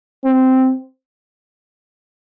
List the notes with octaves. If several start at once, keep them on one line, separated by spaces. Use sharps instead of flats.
C4